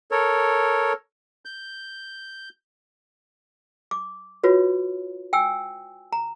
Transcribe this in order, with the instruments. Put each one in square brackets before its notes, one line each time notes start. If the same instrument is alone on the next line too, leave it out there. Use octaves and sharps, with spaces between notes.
[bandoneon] A4 A#4 C#5
G6
[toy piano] D6
F4 F#4 B4 C#5
G5 G#5 E6
A#5